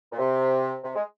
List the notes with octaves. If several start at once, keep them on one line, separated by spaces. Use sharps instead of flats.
A#2
C3
C3
G#3